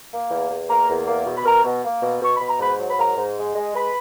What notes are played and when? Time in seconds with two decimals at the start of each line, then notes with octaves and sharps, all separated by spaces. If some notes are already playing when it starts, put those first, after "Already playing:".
0.12 A#3
0.31 E2
0.50 E2
0.69 A#3 A#4 A#5
0.88 E2
1.07 A#3
1.27 B2
1.35 B5
1.45 B2 A#4 A#5
1.64 B2
1.84 A#3
2.03 B2
2.22 B2 C#6
2.34 B5
2.41 B2
2.48 A#5
2.60 G#2 B4 B5
2.79 F#3
2.90 B5
2.98 G#2 A#4 A#5
3.17 G#2
3.37 G#3
3.56 G#3
3.75 G#3 B4 B5